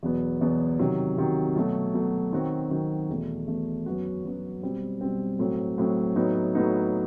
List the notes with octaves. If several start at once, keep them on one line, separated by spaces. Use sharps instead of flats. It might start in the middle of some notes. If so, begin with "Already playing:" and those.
E2 B2 F#3 B3
E2 B2 F#3 B3
C3 D#3 F#3
C3 D#3 F#3
B2 F#3 A3
B2 F#3 A3
D#3 F#3 C4 F#4
D#3 F#3 C4 F#4
E2 B2 A3
E2 B2 A3
F#2 F#3 B3 F#4
F#2 F#3 B3 F#4
B2 G3 C4
B2 G3 C4
A2 F#3 C4
A2 F#3 C4
A2 F#3 B3 D#4
A2 F#3 B3 D#4